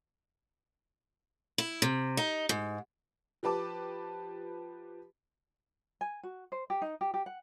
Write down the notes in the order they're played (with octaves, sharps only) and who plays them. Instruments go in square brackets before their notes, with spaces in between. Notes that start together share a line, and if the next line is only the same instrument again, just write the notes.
[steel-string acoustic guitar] E4
C3
D#4
G#2
[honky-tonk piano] F3 G4 B4 A5 D6
[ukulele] G#5
F#4
C5
G4
D#4
G4
G4
F#5